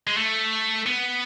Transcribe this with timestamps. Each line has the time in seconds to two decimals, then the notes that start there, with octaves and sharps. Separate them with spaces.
0.07 G#3
0.17 A3
0.87 B3